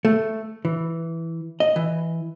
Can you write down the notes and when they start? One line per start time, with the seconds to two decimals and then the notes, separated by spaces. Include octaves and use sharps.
0.05 A3
0.65 E3
1.60 D#5
1.76 E3